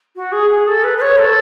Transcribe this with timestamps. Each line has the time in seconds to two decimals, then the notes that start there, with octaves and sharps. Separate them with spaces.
0.16 F#4
0.32 G#4
0.50 G#4
0.67 A4
0.84 B4
0.97 B4
1.01 C#5
1.19 A4